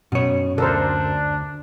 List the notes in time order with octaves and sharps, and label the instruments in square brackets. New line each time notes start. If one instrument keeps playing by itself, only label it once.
[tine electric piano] F#2 [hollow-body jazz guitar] B2 C#5
[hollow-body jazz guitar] D2 [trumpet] D4 [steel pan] A4 A#4 C5